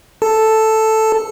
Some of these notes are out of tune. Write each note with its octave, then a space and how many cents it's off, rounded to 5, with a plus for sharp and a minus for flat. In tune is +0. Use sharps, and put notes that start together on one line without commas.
A4 +0 A5 +0